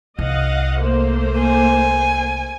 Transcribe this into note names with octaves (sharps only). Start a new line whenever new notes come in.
C2 D#5 F5 F#5
A3 A#3 C5
G#5